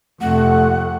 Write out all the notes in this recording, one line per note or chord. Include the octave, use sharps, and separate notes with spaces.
F2 C3 A3 F#5